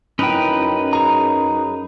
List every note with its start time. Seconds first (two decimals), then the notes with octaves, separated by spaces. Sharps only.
0.19 F#2 C#4 D#4 E4 B4 G5
0.93 G#4 A#5